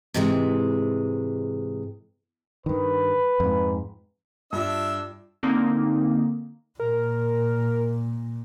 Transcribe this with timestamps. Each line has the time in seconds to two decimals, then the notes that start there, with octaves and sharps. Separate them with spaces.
0.14 G#2 C3 E3 G#3
2.66 G2 D#3 B4
3.40 F2 G#2
4.53 G2 D4 F4 A4 E5 E6
5.43 D3 A#3 C4 D#4
6.80 A#2 A#4